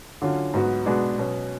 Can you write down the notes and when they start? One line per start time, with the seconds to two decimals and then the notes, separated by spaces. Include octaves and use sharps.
0.22 D3 F#3 C#4 F4
0.54 G#2 F#3 B3 F#4
0.86 B2 G#3 B3 D4 F#4
1.18 B2 F#3 C#4